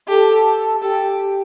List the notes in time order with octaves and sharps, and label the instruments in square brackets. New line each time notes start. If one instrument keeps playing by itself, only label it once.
[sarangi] G4 [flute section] A4 A5
[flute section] G4 G5 [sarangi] A4